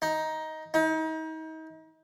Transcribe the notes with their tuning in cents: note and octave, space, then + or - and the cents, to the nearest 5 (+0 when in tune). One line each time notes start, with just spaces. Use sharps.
D#4 +10
D#4 +35